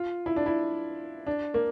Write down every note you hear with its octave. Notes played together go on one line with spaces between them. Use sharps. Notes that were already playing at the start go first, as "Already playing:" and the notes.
Already playing: F4
E4
D4
E4
D4
A#3